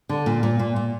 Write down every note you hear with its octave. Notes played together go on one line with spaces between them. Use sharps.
D3
A#2
A#2
A#2
A#2